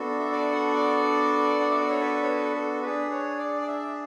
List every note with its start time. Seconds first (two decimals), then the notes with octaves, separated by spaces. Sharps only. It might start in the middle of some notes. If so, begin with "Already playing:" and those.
Already playing: B3 D4 F#4 A4
0.19 E5
0.32 D5
0.52 F#5
0.73 D5
0.95 D5
1.60 F#5
1.70 E5
1.81 D5
1.90 C#5
2.00 B4
2.23 C#5
2.27 B4
2.56 A4
2.83 D4 G#4 B4
3.11 C#5
3.39 D5
3.62 D5
3.67 E5